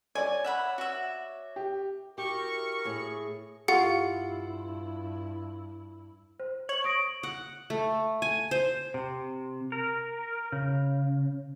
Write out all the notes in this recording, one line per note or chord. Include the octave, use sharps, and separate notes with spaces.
C#5 D5 G#5
E5 F#5 B5
F#4 E5
G4
E4 F#4 G4 A#4 C#6
A2 G#4
G2 E4 F4 G4 F#5 C#7
C5
C#5 F#7
C#6 D#6 A#6 D7
F#5
A3
G#5
C5
C3
A#4
C#3